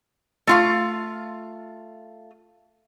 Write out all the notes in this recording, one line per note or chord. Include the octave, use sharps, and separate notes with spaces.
A3 F4 F5